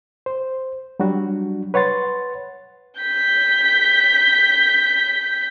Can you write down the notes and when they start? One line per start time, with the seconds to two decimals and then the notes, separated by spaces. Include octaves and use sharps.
0.26 C5
1.00 F#3 G3 D4 F#4
1.74 B4 C#5 F#5 C6 A6
3.01 G6 B6